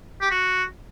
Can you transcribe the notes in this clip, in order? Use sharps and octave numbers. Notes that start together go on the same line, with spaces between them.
G4
F#4